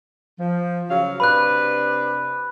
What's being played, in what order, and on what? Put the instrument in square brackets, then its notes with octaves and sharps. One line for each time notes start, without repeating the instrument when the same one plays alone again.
[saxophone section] F3
C#3 F#3 F5
[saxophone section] C3 D4 B4 [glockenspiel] B5 F#6